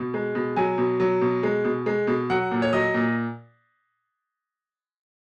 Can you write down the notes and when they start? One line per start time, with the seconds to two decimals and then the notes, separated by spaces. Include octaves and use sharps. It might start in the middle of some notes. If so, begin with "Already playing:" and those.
Already playing: B2
0.14 G#3
0.35 B2
0.56 F#3 G#5
0.78 B2
1.00 F#3
1.21 B2
1.43 G#3
1.64 B2
1.86 G#3
2.07 B2
2.30 F#3 F#5
2.51 A#2
2.62 C#5
2.73 F#3 D#5
2.94 A#2